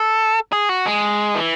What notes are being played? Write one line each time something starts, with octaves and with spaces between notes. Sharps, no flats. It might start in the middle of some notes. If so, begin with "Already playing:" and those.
Already playing: A4
G#4
F#4
G#3
E3